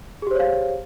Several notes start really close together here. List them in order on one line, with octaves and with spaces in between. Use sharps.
G#4 G4 C5 C#5 F5